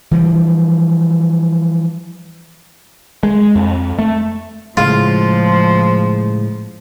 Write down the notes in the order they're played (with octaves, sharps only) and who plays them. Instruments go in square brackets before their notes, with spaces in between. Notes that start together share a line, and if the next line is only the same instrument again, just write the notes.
[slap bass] E3 F3 G3
[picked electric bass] G#3
F2
A3
[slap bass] A2 C#3 G#3 [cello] F3 [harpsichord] F4